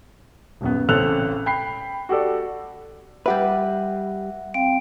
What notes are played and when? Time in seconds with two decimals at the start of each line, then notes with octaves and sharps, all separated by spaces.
0.61 D#1 F#2 B3
0.89 A1 C#3 C4 A4 F#6 F7
1.46 G5 B5 C7
2.09 F#4 G4 A4 D5
3.26 G3 G4 B4 E5 F#5
4.54 C4 F5 G5 D7